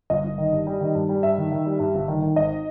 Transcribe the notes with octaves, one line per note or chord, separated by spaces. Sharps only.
G1 D#5
G1
D#3
G2
G3
D#3
G2
G3
G2 E5
D#3
D#3
G3
G2
G1
D#3
D#3
G#1 D#5